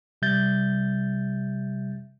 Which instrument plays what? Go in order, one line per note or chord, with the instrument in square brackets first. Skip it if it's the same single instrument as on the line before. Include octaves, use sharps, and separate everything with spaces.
[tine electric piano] C3 G3 E5 G6 A6